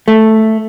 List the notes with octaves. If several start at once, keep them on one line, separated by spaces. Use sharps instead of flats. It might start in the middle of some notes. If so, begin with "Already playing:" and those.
A3